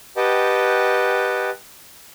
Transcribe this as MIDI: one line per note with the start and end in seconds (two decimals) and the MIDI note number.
0.17 1.50 67
0.17 1.50 71
0.17 1.50 75
0.17 1.50 78
0.17 1.50 79
0.17 1.50 81